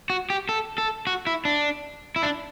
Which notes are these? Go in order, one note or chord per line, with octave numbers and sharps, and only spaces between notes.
F#4
G4
A4
A4
F#4
E4
D4
E4
D4